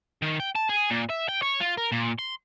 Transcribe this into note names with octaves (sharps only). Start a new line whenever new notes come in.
D#3
G5
A5
G#4
A#2
E5
G5
C#5
F4
A#4
A#2
C6